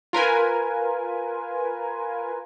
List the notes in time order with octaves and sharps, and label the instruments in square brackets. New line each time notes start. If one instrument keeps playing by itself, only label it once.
[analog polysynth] F4 A#4 B4 G#5